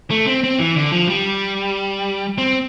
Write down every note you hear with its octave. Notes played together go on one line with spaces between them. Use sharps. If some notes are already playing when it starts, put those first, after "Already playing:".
A3
C4
C4
E3
D3
F3
G3
C4